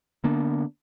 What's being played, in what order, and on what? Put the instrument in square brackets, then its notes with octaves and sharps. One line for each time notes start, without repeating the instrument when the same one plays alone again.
[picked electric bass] D3 A#3 B3 D4